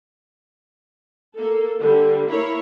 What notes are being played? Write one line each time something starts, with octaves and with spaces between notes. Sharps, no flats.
A#3 A4
D3 G3
A#3 E4 C#5